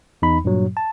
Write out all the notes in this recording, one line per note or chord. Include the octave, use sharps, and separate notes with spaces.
E2 D#4 B5
G2 A#2 F#3
A5